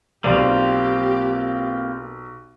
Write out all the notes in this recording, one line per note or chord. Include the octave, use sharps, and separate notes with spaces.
B1 A#3 C4 F4 G4 D5